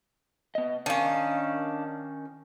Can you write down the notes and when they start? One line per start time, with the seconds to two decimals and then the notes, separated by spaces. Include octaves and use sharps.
0.55 B3 D#5
0.86 D#3 C#4 D4 F5